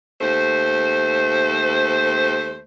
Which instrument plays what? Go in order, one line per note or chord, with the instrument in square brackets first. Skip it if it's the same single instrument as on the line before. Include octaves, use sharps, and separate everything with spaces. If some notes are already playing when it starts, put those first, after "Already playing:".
[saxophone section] D#2 A3 C5